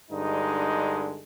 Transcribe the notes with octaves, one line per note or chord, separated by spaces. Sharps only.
G2 D3 G#3 D#4